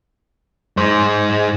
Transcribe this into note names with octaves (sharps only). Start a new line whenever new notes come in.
G#2 C5